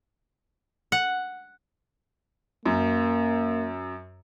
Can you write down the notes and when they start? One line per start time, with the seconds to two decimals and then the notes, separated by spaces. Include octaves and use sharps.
0.92 F#5
2.66 F#2 A#3